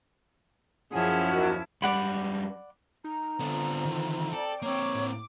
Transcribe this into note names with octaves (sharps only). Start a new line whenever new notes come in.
F#2 F3 C#4 E4 G#4 F#5 A5
D#2 F#4
F#2 G3 D5 F#5 B5
D#4 A#5
D3 B3 C4 D4 F4
D#3 E3
A4 D5 G5
A#3 C4 C#5 D6
A2